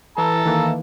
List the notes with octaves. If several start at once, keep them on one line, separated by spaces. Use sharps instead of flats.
E3 A4 A5 A#5
D#3 E3 A#3